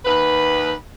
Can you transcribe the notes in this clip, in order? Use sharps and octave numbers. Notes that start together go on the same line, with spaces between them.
D#2 B4